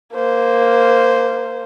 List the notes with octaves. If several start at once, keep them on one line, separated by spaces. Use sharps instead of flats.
A#3 C5